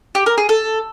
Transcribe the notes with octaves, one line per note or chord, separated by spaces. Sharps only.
G4
A#4
G#4
A4